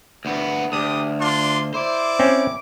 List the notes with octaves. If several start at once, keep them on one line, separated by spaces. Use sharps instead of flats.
D2 B3
D2 D4 G4 D#6
D4 F4 C6
E4 C5 D5 D6
C4 C#4